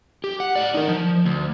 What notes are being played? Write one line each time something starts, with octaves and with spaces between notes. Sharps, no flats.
G4
F#5
A2 D5
D#4 A#4
F3
D2